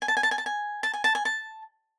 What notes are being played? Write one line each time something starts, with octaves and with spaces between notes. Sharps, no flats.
G#5
A5
G#5
A5
G#5
A5
G#5
A5
G#5
A5
G#5
A5